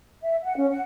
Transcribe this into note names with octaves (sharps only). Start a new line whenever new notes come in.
E5
F#5
C#4
F#5